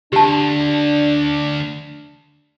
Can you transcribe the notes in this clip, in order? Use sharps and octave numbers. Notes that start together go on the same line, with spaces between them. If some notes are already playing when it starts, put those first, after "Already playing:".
D2 D4 G4 A5